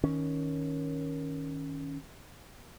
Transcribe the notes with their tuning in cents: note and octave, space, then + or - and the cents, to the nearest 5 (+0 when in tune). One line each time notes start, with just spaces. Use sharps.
D#3 +10 C#4 +0